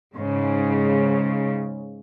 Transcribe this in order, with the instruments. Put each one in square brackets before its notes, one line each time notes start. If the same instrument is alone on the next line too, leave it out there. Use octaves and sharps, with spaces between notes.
[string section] G#2 C#3